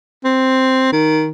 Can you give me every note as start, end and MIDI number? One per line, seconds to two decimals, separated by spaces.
0.24 0.92 60
0.92 1.32 51